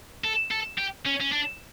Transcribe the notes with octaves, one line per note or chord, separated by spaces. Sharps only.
A4
A4
G4
C#4
C#4
D4